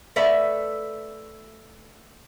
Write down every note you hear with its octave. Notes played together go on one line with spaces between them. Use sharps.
A3 A4 B4 D5 E5